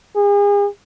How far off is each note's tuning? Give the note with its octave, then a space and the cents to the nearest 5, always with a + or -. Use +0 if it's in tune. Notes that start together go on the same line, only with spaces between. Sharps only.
G#4 -40